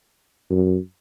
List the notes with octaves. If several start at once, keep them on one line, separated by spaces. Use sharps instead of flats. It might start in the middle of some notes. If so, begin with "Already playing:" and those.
F#2